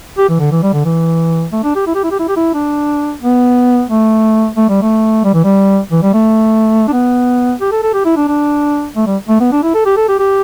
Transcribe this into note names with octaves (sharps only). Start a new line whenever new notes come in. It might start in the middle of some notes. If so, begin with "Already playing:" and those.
G4
E3
D3
E3
G3
D3
E3
A3
D4
G4
E4
G4
E4
G4
E4
G4
E4
D4
B3
A3
A3
G3
A3
G3
E3
G3
E3
G3
A3
D4
B3
G4
A4
A4
G4
E4
D4
D4
A3
G3
A3
B3
D4
E4
A4
G4
A4
G4
G4